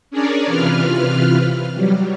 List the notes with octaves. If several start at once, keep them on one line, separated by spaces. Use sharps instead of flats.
C#4 D4 G#4 A#4 C#5 D5
C3 E3 F4 B4 F6
F#3 G3